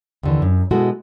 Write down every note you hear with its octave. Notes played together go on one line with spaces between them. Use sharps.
D#2 D3 E3
F#2
B2 G#3 E4 F#4 A4